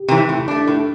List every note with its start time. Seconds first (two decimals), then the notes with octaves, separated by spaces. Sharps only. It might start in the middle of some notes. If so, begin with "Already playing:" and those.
Already playing: G4
0.08 C3 E3
0.29 A2
0.48 A3 D4
0.67 A2 A4